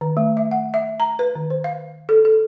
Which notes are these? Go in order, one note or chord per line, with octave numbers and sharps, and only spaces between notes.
D#3
A3
E5
F#5
E5
A#5
B4
D#3
C5
F5
A4
A4